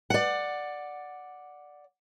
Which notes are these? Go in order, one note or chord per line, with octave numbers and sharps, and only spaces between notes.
D5 F#5